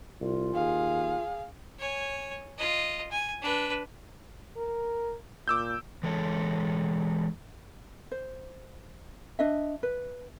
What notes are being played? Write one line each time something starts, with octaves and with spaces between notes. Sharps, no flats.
C2 F4
D#2 G#4 F5
C#5 G#5
F4 D#5
G#5
D4 B4
A#4
A#2 D6 E6 G6
E3 G#3 A4 C#5
C5
D4 D#5 E5
B4